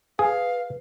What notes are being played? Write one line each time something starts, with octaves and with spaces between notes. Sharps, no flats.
G#4 B4 F5